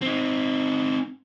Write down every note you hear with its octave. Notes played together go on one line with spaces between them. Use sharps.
C4 D#4